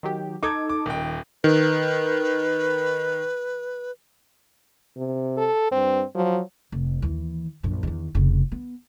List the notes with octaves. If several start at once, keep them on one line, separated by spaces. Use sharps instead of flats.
D#3 F#3 G4
D#4 A4 D6 G#6
D6
D#1 D#3 G5
D#3 B4
C3
A4
G2 C4
F3 F#3
F1
D#2 E3
A#1 F#2
E2 D#3
F1 C#3
B3